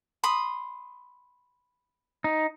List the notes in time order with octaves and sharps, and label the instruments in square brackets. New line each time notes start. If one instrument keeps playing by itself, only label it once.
[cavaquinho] B5 C6 D#6
[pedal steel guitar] D#4